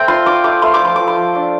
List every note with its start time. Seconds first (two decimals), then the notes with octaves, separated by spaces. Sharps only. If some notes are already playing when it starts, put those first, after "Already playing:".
Already playing: A3 C4 G5
0.08 F4 C6
0.26 F4 D6
0.44 A3 D6
0.62 A3 C6
0.74 D6
0.82 F3 C6
0.96 F3 D6
1.08 C6
1.17 F3
1.35 D4